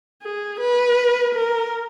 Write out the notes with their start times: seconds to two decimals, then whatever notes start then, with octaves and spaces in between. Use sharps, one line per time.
0.22 G#4
0.60 B4
1.34 A#4